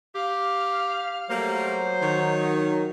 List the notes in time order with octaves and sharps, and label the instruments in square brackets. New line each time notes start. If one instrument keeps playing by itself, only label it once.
[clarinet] G4 [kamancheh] F5 F6
[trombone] F#3 [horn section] G3 A3 A#3 [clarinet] C5
[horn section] D#3 [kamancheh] C#5